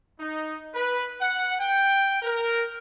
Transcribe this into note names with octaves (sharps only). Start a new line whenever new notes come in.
D#4
B4
F#5
G5
A#4